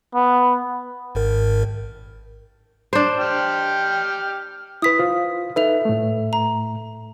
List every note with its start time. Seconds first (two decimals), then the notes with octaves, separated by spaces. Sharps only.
0.15 B3
1.15 G#1 G#2 A#4
2.93 D4 C5
3.19 G4 G5 F6
4.82 E4 B4 D#6 B6
4.99 F4 C5 F5
5.56 D#4 A4 B4 E5 F7
5.85 A2 A3
6.33 A#5